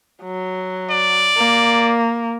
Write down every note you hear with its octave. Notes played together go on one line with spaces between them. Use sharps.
F#3
D5
A#3